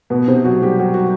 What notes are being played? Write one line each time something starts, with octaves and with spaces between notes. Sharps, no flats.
B2 B3
C3 C4
F#3 F#4
G3 G4
F#3 F#4
F#4